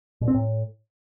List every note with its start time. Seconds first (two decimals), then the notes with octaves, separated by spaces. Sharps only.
0.21 A#2
0.28 C4
0.34 A2